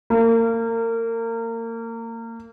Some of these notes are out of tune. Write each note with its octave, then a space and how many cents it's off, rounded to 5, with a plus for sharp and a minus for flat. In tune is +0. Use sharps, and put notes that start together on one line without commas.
A#3 -30